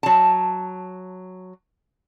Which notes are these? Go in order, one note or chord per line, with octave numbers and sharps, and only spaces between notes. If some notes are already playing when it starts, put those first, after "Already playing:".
F#3 A5